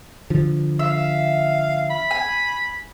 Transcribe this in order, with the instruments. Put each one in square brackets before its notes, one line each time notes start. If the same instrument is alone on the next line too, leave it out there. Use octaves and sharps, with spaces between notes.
[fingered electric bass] D3 F3
[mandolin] E5 [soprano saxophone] F5
[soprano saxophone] B5
[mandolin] G#5